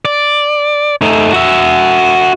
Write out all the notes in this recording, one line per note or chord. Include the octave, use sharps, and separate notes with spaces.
D5
A3 D#4
F#4 E5